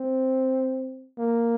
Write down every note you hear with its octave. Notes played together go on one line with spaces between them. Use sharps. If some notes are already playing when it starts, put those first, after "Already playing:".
Already playing: C4
A#3